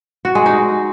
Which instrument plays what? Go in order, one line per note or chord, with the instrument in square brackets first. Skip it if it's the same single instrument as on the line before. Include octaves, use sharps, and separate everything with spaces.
[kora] F#4
G#3
D#4